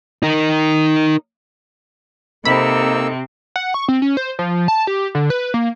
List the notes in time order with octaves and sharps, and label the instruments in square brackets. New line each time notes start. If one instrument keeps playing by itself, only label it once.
[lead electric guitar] D#4 A#4
[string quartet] C3 C4 [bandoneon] A#3 E6 [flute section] D#4 A4 D#5 [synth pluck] B5
[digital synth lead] F#5
C#6
C4
C#4
C5
F3
A5
G4
D3
B4
A#3